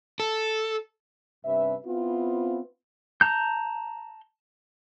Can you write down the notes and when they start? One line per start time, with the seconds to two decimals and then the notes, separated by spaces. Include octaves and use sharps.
0.20 A4
1.44 G2 C3 C#4 B4 E5
1.86 B3 C4 E4 F4
3.21 A5 A#5 G6